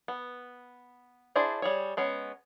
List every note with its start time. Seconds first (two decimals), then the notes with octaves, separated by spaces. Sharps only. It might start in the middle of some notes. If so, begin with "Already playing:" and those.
0.08 B3
1.35 D4 E4 G#4 C5 D5
1.62 G3 G#4 C#5
1.97 G#3 B3 C#4